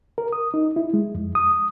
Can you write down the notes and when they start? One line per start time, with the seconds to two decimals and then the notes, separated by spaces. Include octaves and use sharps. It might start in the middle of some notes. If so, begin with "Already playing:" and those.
0.18 A#4
0.33 D#6
0.54 D#4
0.76 E4
0.94 G#3
1.15 F2
1.35 D#6